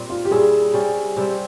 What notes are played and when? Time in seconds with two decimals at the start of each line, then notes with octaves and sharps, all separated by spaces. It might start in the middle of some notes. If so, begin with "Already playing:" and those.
Already playing: A#2 G3 C4
0.10 F4
0.25 G4
0.31 A#2 G3 C#4 E4 G#4
0.74 C3 G3 C#4
1.17 C3 G3 C4